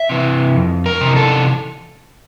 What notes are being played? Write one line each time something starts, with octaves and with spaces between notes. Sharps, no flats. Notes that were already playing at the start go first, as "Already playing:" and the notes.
Already playing: E5
C3 E3
F2
A#4
C3 E3
A4